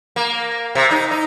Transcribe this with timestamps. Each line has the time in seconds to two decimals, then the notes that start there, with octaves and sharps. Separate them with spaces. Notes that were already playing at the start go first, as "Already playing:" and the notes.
0.16 A#3
0.75 C3
0.91 D#4
1.11 D#4